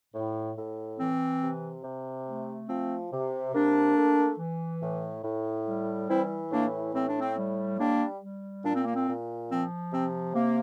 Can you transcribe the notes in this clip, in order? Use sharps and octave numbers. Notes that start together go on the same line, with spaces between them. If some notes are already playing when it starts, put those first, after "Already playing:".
A2
A2
E3 C4
C3
C3
A3
F3 C4
C3
C3 A#3 D4
A3
E3
A2
A2
G3
E3 C4 E4
A2 A#3 D4
A2 C4
D4
C4
G3
G3 A#3 D4
G3
A#2 D4
C4
A#3
C4
A#2
F3 C4
C3 C4
C3 A#3